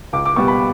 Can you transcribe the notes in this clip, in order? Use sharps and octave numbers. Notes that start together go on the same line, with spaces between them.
C#2 D6
D6
B2 G3 B3 C#6
B5